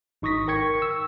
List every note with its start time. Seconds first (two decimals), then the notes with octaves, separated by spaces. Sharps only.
0.22 G#1 D#4 C#6 D#6 A#6 B6
0.48 A#4 G5 C#6 G#6 C#7
0.82 E6